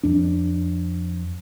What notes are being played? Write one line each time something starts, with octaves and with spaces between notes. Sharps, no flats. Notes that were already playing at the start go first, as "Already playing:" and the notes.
F2 D4